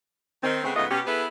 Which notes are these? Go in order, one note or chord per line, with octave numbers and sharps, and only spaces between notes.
D#3 C4
C#3 G#3 A3 B3 C4
G#2 C#3 A3 B3 F4 D#5
B2 C#4 G4
B3 E4 G#4 A4 B4